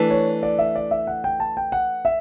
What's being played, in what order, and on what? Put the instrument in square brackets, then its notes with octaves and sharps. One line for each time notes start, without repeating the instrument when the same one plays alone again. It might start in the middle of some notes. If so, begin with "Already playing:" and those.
Already playing: [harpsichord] E3 A3 D4
[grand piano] C#5
D5
E5
D5
E5
F#5
G5
A5
G5
F#5
E5